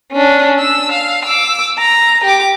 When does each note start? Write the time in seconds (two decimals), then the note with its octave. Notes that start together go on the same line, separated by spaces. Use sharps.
0.12 C#4 D4
0.60 E6
0.92 F5
1.25 D6 E6
1.79 A#5
2.24 G4 D6